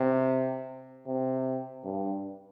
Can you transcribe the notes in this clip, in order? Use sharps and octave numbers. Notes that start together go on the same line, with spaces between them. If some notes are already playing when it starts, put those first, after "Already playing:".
Already playing: C3
C3
G2